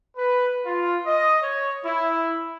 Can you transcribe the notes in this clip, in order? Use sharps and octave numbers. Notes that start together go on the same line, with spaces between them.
B4
F4
D#5
C#5
E4